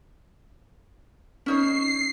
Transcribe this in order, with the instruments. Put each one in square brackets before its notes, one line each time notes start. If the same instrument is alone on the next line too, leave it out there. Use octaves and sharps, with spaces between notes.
[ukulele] C#4 D#4 C#5 [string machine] C7